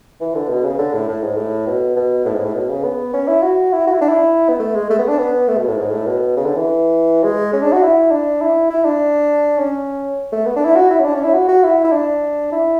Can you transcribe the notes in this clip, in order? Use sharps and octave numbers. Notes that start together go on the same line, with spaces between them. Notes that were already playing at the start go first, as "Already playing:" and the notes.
E3
D3
B2
C#3
D3
A2
A2
G#2
A2
B2
B2
A2
G#2
A2
B2
C#3
B3
C#4
E4
F#4
E4
F#4
E4
D4
E4
B3
A3
G#3
A3
B3
D4
B3
A3
B2
A2
G#2
A2
B2
C#3
D3
E3
G#3
C#4
D4
F#4
E4
D4
E4
E4
D4
C#4
A3
B3
D4
E4
F#4
E4
C#4
D4
C#4
E4
F#4
F#4
E4
E4
D4
E4